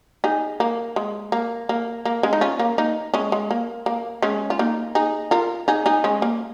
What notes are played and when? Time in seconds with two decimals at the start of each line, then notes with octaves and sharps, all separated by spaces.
0.24 D#4 G#4
0.60 A#3
0.96 G#3
1.32 A#3
1.69 A#3
2.05 A#3
2.23 G#3 C#4
2.33 D#4
2.41 C#4 F4
2.59 A#3
2.78 A#3 D#4
3.14 G#3 C#4
3.32 G#3
3.51 A#3
3.86 A#3
4.22 G#3 C#4
4.50 F4
4.59 A#3 D#4
4.95 D#4 G#4
5.31 F4 A#4
5.68 D#4 G#4
5.86 D#4 G#4
6.04 G#3 C#4
6.22 A#3